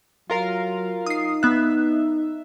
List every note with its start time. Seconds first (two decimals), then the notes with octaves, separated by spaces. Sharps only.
0.30 F#3 F4 A#4 F5
1.06 D#4 D#6 C7
1.43 B3 E5 F#6